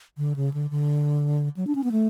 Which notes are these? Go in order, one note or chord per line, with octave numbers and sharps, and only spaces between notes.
D3
C#3
D3
D3
F#3
D4
C#4
B3
A3